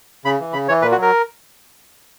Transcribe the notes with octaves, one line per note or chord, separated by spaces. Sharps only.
C#3 B5
E3
C#3 B5
E3 C#5
A#2 B4
F#4
F#3
A#4